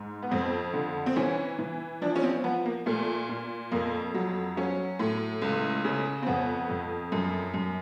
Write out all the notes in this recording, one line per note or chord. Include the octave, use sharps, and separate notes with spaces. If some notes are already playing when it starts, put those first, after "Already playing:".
Already playing: G#2
B3
F2 C4
D3
C4
E3 C#4
E3
F3 D4
C#4
C4
F3 B3
A#3
A#2 A3
A#2
F2 A#3
F#3
F#3 C#4
A2
C#2
C#3
C4
F2 B3
F2
F#2
F#2